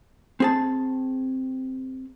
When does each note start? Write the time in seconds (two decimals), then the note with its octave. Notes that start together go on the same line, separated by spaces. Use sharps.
0.40 C4 G#4 A5